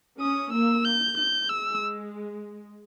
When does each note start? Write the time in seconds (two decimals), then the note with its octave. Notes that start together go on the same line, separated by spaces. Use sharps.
0.20 C#4 D#6
0.53 A#3 E6
0.85 G6
1.17 G6
1.49 G#3 E6